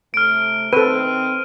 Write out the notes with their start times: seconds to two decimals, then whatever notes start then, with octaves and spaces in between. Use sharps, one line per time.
0.14 C3 A3 F6 D7
0.73 D#3 C4 A4 B4 D#7